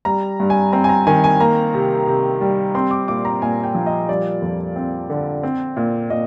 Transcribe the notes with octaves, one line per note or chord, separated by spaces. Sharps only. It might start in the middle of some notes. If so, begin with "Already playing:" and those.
G3 A#5
G2
G#5
C4 A#5
G#5
A#5
D#3 G#5
G#5
A#3 A#5
C3
C3
G3
C4 C6
D6
A#2 D6
A#5
A#2 G#5
G5
F3
D#5
G3 D5
F2
C4
D3
C4
A#2
A#2 D#5